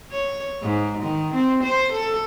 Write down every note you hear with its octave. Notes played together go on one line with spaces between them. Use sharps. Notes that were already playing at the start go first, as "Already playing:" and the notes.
C#5
G#2
D#3
C4
C5
A4